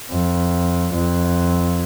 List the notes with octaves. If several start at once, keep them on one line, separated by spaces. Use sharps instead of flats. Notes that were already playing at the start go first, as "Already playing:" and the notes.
F2
F2